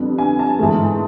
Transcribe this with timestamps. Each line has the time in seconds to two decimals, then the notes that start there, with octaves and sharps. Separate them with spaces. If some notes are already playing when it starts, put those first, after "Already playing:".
Already playing: F2 D3 G3 B3
0.18 G#5
0.39 A5
0.59 G#2 E3 A3